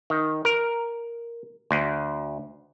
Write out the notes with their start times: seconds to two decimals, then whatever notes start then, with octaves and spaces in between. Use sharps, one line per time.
0.10 D#3
0.45 A#4
1.71 D2